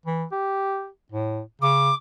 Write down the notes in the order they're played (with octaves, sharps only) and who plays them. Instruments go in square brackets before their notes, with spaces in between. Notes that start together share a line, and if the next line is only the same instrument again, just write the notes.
[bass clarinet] E3
G4
A2
[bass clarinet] C#3 [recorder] D6